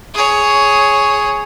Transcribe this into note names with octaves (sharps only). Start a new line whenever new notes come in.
G#4 C#5